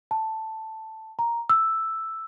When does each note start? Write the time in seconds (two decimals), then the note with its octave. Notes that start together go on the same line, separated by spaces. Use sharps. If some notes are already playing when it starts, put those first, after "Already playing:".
0.11 A5
1.19 A#5
1.50 E6